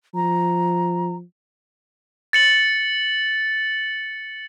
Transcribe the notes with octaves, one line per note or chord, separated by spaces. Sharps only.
F3 A#5
A6 C#7 F#7